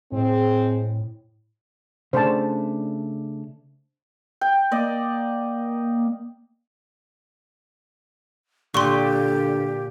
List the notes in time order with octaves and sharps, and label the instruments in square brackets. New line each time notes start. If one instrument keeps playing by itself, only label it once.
[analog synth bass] A2 [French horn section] G#3 C4
[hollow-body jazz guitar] C#3 A3 D4 [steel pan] C5 A5
[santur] G5
[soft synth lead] A#3 [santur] D5 D#5
[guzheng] A#2 [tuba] D3 [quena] G4 [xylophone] C6 C#6